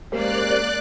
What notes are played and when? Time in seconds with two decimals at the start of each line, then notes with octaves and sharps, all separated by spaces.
0.12 G#3 A#3 C#4 G4 A#4 C5 D5 F#6